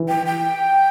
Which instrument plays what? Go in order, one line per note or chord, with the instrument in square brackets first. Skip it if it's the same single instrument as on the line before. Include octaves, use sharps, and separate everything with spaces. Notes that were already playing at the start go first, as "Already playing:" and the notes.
Already playing: [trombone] E3
[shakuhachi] G5
G5